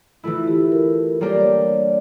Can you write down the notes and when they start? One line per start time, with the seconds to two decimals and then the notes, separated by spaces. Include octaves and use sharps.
0.23 E3 A3 E4 F4
0.47 G4
0.72 A#4
1.21 G3 A#3 D4 G4 A#4 C#5
1.30 D5
1.40 C#5